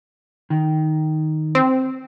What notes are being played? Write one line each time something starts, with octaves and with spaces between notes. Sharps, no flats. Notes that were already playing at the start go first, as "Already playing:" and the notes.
D#3
C4